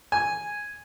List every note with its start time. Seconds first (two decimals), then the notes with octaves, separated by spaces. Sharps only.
0.12 G#5